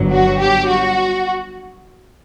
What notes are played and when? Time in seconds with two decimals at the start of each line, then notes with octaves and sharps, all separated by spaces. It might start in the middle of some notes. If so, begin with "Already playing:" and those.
Already playing: G1 G2 F#3
0.11 F#4
0.40 G4
0.69 F#4